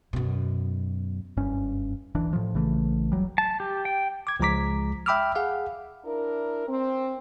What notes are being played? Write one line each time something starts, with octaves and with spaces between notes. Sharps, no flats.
F#2 B2
F#1 G2 C#4
D1 G#1 E3 D4
A2 F3
A#1 C#3 E3 A3
E1 F2 F#3 G3
A5
G4
G5
D6 G#6
C#2 F3 G#3 A#5 D6 B6
E5 G5 B5 D6 E6 F6
G#4 F5 F#5
D4 E4 A#4
C4